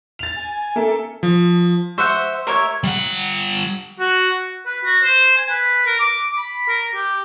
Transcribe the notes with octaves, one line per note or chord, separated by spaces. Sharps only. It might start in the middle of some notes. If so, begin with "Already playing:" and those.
A6 F7
G#5
A#3 A4 E5
F3
C5 E5 F#5 C#6 E6
A#4 C#5 E5
G3 F#5
F#4
B4
F#4
C5
G#5
B4
A#4
D6
B5
A#4
G4